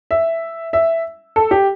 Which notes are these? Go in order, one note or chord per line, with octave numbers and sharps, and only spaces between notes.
E5
E5
A4
G4